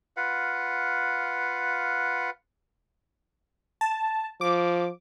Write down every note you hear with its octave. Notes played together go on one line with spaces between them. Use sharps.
F4 B4 F5 F#5
A5
F3 D6